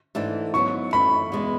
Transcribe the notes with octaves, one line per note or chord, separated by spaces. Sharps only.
G#2 E3 A3 D4 A4
G#2 F#3 B3 E4 C#6
F#2 E3 A3 B5
E2 B2 G#3